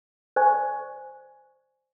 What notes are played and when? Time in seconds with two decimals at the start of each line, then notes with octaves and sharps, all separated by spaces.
0.36 C5 D5 G#5 C#6